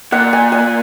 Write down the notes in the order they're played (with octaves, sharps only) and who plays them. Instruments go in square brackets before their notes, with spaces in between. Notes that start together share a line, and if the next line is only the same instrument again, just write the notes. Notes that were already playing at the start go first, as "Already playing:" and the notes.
[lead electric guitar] A#2 [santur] F#5
[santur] G#5
G#5